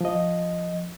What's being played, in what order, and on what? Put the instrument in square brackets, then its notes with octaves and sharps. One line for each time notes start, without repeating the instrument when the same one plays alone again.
[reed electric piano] F3 D#5